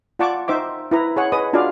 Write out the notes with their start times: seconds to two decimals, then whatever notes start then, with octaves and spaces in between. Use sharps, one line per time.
0.19 F4 D5 F#5 A5 C#6 D6
0.48 D#4 C5 E5 D6
0.91 E4 B4 A#5
1.16 G#4 C#5 F#5
1.32 G#4 B4 D#5 D#6
1.53 D4 F4 F#4 G#4 D5 F5